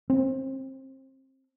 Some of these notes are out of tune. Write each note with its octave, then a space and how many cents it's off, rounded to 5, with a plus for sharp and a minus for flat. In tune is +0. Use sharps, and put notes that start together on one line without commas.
C4 +25